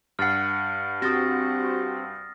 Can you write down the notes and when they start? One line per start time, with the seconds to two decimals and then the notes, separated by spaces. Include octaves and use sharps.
0.19 G2 F#5 F6 A6 C7
1.02 C4 F#4 G4 D#6 A6 A#6